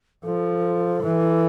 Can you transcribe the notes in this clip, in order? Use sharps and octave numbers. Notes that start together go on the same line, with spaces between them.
F3 A4
E3